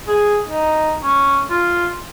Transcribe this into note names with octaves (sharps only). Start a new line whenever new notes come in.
G#4
D#4
C#4
F4